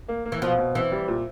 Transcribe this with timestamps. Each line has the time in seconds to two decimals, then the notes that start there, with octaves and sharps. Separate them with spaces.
0.08 A#3
0.25 A#3
0.32 E3
0.42 B2 F3
0.58 B2
0.75 E3 C4
0.92 G3
1.08 A#2